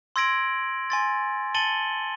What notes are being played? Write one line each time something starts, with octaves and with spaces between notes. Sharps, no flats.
C6 E6 G#6 A#6 D7 F#7
G#5 C6 A6
A5 A6 C#7 D#7 F#7 G7